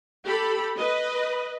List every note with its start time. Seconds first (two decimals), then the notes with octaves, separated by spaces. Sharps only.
0.24 G4 A4 B5
0.77 B4 D#5